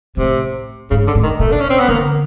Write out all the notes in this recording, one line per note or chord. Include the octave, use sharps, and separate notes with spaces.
A2 C3
G#2 C#3
D3
A2
D#3
B2 A3
D4
C#4
C4
B3
D3 A#3